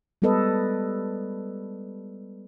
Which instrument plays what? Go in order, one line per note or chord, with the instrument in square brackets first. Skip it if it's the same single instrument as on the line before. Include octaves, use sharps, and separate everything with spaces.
[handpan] G3 G#3 B3 A4 B4 D#5